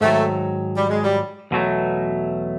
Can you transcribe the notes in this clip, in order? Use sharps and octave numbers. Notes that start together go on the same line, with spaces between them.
G#2 D#3 F#3 A3
G3
G#3
G3
E2 B2 F#3 A3